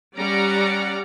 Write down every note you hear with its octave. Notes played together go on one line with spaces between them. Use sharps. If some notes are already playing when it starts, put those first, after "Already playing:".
G3 C#4 D5 F#5 A#5